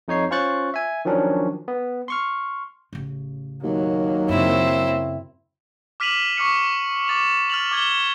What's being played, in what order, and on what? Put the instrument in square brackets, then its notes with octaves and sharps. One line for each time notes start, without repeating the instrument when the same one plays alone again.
[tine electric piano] F2 D#4 C#5 C7
C#4 F4 C5 C#6 F#6 A6
E5 G#5
D#3 F3 F#3 C#4 D4
B3
C6 C#6 F6
[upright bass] A1 C#3
[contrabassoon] D#2 [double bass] F#3 A#3
[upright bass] F#2 C#3 [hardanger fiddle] C4 E4
[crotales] D6 F6 B6 D#7 F7 F#7
C#6 D6 F6 C#7
D6 A6 F7
F6 A6 F7 F#7
D6 G#6 G7